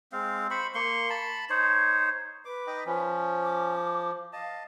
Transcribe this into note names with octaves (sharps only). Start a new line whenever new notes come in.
G#3 C4 F5
C5 B5 C#6
A#3 C6 C#6
A5 B5
D#4 C5 C#5
B4 D6
D#4 D#5 G5
F3 C#4
D6
D#5 F5 A5